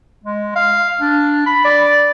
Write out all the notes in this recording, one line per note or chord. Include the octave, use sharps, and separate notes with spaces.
G#3
F5
D4
B5
D5